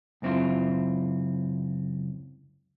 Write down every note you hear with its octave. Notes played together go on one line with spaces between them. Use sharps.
C#2 F#2 C4 E4 F4